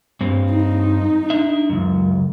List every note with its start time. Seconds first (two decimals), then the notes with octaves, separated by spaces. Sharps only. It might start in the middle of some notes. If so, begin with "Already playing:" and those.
0.21 G2 C4
0.51 D#4
1.30 D4 E5
1.69 C#2 F#2